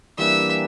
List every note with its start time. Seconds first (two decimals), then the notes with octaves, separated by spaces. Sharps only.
0.18 E3 G3 A#3 D4 E5